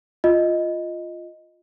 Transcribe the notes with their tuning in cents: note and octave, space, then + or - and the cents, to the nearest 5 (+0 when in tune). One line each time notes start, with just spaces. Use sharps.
F4 +0 D#5 +0